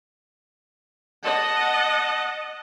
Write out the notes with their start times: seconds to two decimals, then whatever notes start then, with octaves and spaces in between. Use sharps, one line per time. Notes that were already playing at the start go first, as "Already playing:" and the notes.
1.24 D#5 F#5 A5